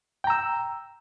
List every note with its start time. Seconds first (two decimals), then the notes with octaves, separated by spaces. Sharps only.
0.24 G5
0.27 A#5
0.30 E6